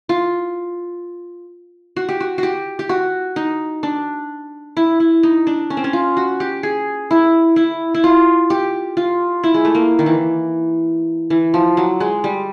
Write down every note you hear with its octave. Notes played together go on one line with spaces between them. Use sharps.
F4
F#4
G4
F#4
F#4 G4
G4
F#4
D#4
D4
E4
E4
D#4
D4
C#4
C4
C#4
F4
F#4
G4
G#4
E4
E4
E4
F4
G4
F4
E4
G#3
A3
A#3
D#3
E3
E3
F3
F#3
G#3
G3